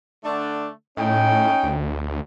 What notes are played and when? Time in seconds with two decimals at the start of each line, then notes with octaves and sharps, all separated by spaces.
0.24 D3 A3 D4
0.97 A2 C#4 D#4 G5
1.63 D2